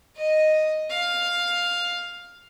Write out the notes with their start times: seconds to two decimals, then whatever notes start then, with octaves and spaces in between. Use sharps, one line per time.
0.16 D#5
0.90 F5